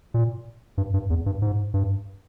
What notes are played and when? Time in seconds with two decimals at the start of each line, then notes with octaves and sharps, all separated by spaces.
0.14 A#2
0.78 G2
0.94 G2
1.10 E2
1.26 G2
1.42 G#2
1.74 G2